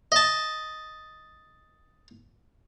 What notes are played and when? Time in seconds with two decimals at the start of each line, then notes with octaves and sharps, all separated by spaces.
0.12 D#5 A5